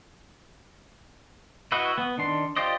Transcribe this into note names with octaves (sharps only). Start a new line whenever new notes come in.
E4 F#4 B4 D#5
B3
D#3 D4 C6
F4 G4 C5 D5 D#5